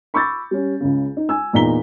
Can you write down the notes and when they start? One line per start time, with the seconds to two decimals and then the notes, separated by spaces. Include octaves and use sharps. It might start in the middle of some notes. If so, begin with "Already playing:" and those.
0.14 B5 C#6 D6 E6 G6 A6
0.51 G3 C#4
0.80 C#2 C#3
1.17 D#4
1.29 G#5 E6
1.53 E2 A#2 D#4 A#5 B6 G7